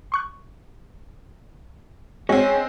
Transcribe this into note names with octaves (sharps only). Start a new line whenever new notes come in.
C6 C#6 F#6
G#3 C4 C#4 F#4